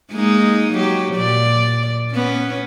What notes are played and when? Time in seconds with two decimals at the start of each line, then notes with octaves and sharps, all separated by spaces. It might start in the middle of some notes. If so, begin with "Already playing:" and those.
0.12 G#3 A#3 D#4
0.73 F#3 G4
1.15 A#2 D5
2.12 B3 C#4